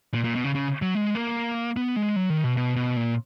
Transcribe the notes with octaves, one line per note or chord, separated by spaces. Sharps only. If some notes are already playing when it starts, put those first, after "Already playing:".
A#2
A#2
B2
C#3
C#3
F#3
G#3
A#3
B3
G#3
F#3
D#3
B2
B2
B2
A#2